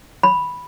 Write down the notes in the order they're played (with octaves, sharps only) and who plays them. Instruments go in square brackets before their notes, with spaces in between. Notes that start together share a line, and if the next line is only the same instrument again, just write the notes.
[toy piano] B5